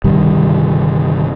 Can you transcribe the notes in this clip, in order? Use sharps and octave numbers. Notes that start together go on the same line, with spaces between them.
G1 C3 D#3 G3